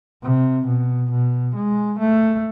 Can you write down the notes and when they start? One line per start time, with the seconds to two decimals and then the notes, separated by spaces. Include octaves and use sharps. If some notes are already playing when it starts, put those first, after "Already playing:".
0.23 C3
0.66 B2
1.11 B2
1.55 G#3
1.99 A3